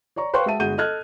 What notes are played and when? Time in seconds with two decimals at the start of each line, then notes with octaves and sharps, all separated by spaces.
0.16 C#5 D5 A#5 C#6
0.34 B4 C5 F5 G5 C6 C#6
0.46 G#3 F#4 E5 G5 A5 D#7
0.59 G1 G#3 F#4 G#4 G6 D#7
0.78 A4 D#5 A5 F6 F#6 G#6